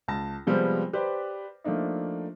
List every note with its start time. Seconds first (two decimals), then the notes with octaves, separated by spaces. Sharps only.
0.08 C#2 A5 A#6
0.47 C3 F3 G3 G#3 B3 C4
0.93 G4 B4 C5 D5
1.64 F3 A3 A#3 D4 D#4